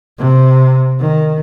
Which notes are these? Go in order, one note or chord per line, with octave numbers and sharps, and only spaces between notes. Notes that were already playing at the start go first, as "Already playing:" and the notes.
C3
D#3